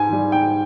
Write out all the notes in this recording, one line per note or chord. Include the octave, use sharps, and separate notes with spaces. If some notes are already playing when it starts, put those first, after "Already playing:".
Already playing: G#2 G#5
D#3 G3
G#2 G5